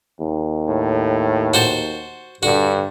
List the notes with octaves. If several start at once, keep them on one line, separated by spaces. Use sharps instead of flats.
D#2
A2
F#4 C5 A5
G2 D3 F#4